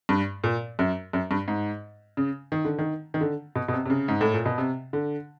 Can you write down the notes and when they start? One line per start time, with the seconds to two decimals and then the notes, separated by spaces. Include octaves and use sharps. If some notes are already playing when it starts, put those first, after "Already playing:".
0.09 G2
0.44 A#2
0.79 F#2
1.13 F#2
1.31 G2
1.48 G#2
2.17 C#3
2.52 D#3
2.65 D3
2.79 D#3
3.14 D#3
3.21 D3
3.56 B2
3.68 B2
3.73 C3
3.86 C3
3.90 C#3
4.08 G#2
4.21 A2
4.34 A#2
4.46 B2
4.58 C3
4.93 D3